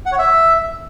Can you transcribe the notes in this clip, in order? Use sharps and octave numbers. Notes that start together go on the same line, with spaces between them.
F#5
C#5
E5